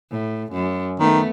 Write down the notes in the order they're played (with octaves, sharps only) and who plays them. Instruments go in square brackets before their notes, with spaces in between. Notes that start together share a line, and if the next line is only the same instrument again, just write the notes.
[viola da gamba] A2
F#2
[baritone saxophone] D#3 [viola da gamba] A3 B3